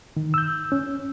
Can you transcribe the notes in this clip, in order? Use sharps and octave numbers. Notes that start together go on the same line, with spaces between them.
D#3
E6 G6
C#4